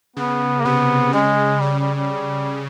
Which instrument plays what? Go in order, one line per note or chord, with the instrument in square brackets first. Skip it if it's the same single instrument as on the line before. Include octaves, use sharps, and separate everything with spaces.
[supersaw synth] C#3 [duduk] B3
[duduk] A#3
[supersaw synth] C3 [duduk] B3
[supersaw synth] C#3 [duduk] G#3
[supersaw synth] C#3 [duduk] G3
[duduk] G3
G3